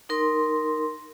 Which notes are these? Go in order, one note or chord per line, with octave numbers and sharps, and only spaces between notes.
D#4 A#4 C6